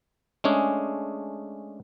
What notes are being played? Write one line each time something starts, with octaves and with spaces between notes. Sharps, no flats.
G#3 A3 C#4 D4 G#4